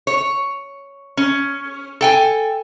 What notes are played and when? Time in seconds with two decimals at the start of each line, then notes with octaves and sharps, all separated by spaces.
0.07 C#5
1.17 C#4
2.01 A4 G5 G#5